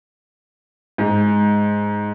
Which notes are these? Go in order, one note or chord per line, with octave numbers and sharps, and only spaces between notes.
G#2